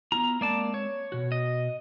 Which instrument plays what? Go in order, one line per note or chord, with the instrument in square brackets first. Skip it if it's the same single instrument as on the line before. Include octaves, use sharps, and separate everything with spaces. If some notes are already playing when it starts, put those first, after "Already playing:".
[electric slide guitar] B3 E4 F4 [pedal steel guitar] A#5
[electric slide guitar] G#3 C4 [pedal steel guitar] A#3 D5 A5
[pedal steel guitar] C#5
[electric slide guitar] B2 F#4
[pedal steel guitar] D#5